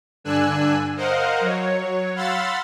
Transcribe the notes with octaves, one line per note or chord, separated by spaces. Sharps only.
G2 D3 D4 G#5 E6 F#6
A#4 C5 D#5 F5 F#5
F#3 C#5
F5 F#5 B5 C6 E6 A6